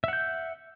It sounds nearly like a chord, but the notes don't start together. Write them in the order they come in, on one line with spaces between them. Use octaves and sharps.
E5 F#5 G6